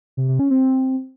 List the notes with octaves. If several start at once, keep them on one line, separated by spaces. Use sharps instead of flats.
C3
C3
C#4
C4